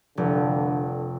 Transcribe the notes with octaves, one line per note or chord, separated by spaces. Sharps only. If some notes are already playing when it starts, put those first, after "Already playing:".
F1 D3